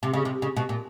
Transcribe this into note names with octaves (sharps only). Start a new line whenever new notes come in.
C3
C#3
C3
C#3
B2
A#2